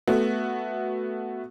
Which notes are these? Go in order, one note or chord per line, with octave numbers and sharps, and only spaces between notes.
A3 B3 F#4